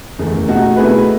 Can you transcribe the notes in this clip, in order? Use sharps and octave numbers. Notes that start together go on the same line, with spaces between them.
F#1 E2 D#3 A3
B2 A3 D#4 F#4 A4
B2 A3 E4 G#4 B4